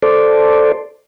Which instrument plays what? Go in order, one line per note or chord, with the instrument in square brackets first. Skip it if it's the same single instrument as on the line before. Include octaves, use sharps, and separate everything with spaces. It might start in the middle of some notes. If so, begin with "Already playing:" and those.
[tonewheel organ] A4 C5 D5